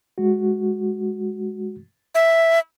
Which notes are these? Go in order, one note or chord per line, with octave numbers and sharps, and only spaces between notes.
G#3 F#4
E5